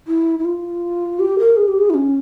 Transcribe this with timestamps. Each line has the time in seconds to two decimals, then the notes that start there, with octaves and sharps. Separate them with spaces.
0.08 E4
0.39 E4
0.45 F4
1.20 G4
1.39 A#4
1.57 G#4
1.68 G4
1.78 G#4
1.90 E4
1.94 C#4